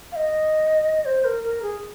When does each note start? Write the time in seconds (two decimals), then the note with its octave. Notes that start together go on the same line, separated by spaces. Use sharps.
0.12 F5
0.16 D#5
1.05 C5
1.25 A#4
1.44 A#4
1.62 G#4